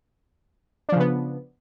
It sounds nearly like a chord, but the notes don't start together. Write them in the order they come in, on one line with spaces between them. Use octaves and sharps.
D4 F3 C#3 B3